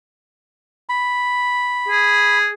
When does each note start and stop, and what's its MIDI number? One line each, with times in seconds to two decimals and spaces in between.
0.89 2.38 83
1.88 2.50 68